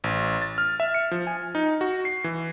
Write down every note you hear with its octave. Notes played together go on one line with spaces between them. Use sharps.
A1
A6
F6
E5
C#7
F3
G#5
D#4
F#4
C7
E3